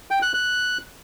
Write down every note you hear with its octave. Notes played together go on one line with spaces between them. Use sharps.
G5
F#6
F#6